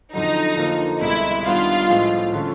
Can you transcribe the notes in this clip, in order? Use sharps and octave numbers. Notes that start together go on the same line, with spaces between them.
F2 D3 F#3 D#4
D3 F3 A#3
C2 B2 G#3 E4
D#3 G3 B3 D4 F4
A2 F3 G#3
D3 F3 A3 C#4